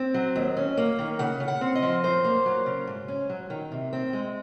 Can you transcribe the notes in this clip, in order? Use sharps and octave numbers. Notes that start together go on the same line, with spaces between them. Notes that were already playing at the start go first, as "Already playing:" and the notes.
Already playing: C4
F#3
D#2
C#4
A#3
D#3
C#3 F#5
C#3
F#5
C4
D#5
F3
F#2 C5
A#3
F#3
C#3
G#2
C#4
F#3
D#3
C3
C4
G#3